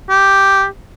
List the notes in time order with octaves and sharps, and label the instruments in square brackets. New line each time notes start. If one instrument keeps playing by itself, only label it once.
[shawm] G4